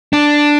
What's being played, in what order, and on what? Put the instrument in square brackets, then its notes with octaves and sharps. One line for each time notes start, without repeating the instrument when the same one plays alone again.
[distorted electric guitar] D4